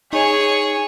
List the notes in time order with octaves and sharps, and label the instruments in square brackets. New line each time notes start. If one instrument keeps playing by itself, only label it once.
[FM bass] D#4 [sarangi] G#4 [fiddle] C#5